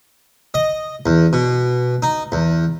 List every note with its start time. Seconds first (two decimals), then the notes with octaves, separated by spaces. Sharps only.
0.54 D#5
1.06 E2
1.33 B2
2.02 D#4
2.32 E2